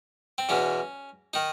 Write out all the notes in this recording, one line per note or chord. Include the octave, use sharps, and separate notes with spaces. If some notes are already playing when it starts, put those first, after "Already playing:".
C4
E2 B2 C#4
D#3 D#4